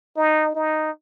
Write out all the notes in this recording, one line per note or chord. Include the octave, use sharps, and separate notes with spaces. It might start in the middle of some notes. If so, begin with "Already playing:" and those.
D#4
D#4